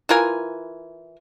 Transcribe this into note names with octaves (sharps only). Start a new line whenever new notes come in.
E3 F4 A#4 G#5